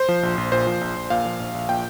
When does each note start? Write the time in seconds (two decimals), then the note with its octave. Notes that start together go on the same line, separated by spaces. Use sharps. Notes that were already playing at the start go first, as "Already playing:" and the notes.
Already playing: C5
0.09 F3
0.23 A#1
0.38 A#1
0.52 A#2 C5
0.67 F3
0.81 A#1
0.96 A#1
1.10 A#2 F5
1.25 F3
1.40 A#1
1.55 A#1
1.69 A#2 G5